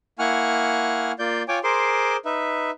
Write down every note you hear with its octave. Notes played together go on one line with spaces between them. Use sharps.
A#3 E4 F#5 G#5 C#6 F6
A#3 F4 D5 G6
F4 C#5 G5 G#5 D6
G#4 A#4 C5 C6 D6
D#4 B4 E5